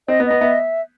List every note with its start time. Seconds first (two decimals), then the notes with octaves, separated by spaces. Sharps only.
0.08 C4 D#5
0.20 B3
0.25 D#5
0.31 B3
0.41 B3 E5